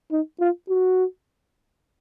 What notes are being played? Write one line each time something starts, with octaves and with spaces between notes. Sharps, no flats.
D#4
F4
F#4